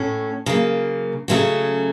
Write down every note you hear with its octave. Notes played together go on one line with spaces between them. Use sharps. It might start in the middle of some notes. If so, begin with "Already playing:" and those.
Already playing: A2 A3 C#4
C#3 F#3 A#3
C#3 F#3 A3 C#4 F#4